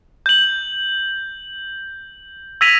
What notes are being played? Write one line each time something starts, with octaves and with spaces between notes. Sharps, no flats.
G6 F#7
E6 G#6 A#6 B6 D#7 F7